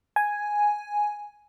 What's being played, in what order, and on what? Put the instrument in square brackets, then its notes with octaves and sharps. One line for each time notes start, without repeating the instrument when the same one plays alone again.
[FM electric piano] G#5